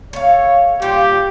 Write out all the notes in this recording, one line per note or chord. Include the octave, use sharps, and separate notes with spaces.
A3 C#5 F5
A#2 G3 F4 G4